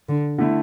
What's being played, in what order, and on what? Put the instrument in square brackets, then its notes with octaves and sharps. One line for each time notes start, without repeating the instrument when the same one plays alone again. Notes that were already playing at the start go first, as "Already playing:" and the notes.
[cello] D3
[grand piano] D3 A3 E4